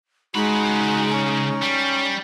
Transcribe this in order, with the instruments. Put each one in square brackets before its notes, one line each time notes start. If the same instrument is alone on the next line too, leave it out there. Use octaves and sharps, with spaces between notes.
[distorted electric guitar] C#3 B5 [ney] G#3 [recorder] D#4 [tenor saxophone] F#4
[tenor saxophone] C#4
[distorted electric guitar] G3